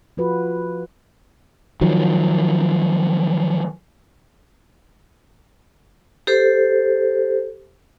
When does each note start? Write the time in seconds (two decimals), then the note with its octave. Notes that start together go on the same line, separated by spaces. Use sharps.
0.17 F3 F4 F#4 B4
1.81 D#3 F3 F#3
6.27 G4 A4 C5